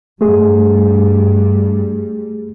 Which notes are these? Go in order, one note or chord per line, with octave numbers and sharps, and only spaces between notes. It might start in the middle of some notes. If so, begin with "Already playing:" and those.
G2 G3 A3 G#4